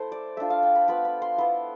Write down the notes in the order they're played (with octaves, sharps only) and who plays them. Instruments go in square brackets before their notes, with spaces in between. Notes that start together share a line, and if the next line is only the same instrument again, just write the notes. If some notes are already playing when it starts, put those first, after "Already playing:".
Already playing: [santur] A3 E4 C5
D5
A3 D4 F4 E5
F5
G5
B5
B3 F4 B5
B5
C6
B3 E4 C6